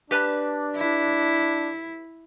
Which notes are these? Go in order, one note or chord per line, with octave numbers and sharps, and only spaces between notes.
D4 G4 B4 A5
E4